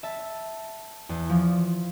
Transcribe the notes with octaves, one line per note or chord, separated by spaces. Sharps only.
E5 A5
E2
F3